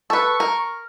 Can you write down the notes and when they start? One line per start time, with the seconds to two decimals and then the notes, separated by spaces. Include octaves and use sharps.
0.10 A4 B4 C#6
0.40 A#4